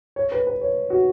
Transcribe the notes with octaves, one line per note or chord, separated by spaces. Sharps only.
C#5
B4
B4
C#5
F#4